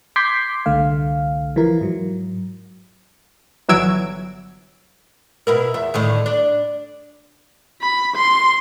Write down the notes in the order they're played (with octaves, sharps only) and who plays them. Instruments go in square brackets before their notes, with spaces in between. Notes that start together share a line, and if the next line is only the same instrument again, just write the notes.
[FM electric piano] C6 D6 G6 G#6 B6 C7
C2 D3 A3 F5
E3 F3 E4 A#4
G#2 F#3
[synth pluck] G1 E3 F#3 E6 G#6 D7
[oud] B2 E4 A#4
E2 E5
A2 D3 D#3
D4
[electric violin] B5
C6